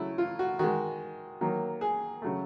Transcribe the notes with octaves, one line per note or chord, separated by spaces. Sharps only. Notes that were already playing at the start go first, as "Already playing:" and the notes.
Already playing: C#3 F#3 A3 E4
F4
F#4
D#3 G#3 F#4
D#3 F#3 A#3
G#4
C#3 F#3 A3